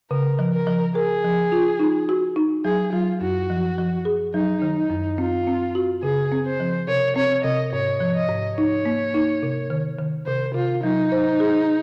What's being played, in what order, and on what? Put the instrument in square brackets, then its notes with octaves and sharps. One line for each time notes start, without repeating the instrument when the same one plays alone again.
[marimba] C#3 [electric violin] A#4
[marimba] F3
[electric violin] A#4
[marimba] F3
[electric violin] G#4 [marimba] A#4
[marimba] F3
F4
D#4
F#4
D#4
[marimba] F#3 [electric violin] G#4
[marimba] F#3 [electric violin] F4
[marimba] F#2 [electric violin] F#4
[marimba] F3
F3
G#4
[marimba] F#3 [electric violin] D#4
[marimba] D#3
[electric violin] D#4
[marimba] F#2
[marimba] C4 [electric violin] F4
[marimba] C4
F#4
[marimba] C#3 [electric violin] G#4
[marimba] C4
[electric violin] C5
[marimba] F3
[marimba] C3 [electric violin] C#5
[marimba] C4 [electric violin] C#5
[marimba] C3 [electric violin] D#5
[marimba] G#2 [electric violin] C#5
[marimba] F3
[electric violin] D#5
[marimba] G#2
[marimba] D#4 [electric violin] C#5
[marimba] A#3
D#4
C3
D#3
D#3
[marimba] C3 [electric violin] C5
[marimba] C3 [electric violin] F4
[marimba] F#3 [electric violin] D#4
[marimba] C5
G#4